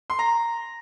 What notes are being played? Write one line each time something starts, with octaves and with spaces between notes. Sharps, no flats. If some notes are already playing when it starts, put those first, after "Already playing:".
C6
A#5